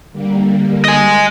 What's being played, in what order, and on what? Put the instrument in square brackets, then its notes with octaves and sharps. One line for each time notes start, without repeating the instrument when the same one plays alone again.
[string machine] D3 G3 A#3
[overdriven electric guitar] D#5 G#5